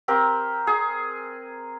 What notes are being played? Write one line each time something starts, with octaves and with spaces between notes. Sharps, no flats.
C4 G4 A#4
G#4